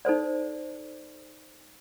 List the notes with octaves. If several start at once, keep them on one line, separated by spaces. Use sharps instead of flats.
D#4 A4 C5 D5